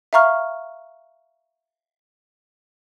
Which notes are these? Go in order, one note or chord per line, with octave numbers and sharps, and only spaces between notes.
E5 F5 A#5 C#6 F6